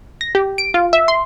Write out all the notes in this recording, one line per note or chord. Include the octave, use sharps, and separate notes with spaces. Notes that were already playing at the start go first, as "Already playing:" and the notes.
A#6
G4
D7
F4
E5
C6